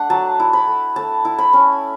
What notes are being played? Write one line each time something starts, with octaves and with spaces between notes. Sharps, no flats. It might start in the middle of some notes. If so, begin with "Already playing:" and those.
Already playing: A3 D4 F#5
F#3 A5
E4
B5
A3
A3 A5
E4
B5
C#4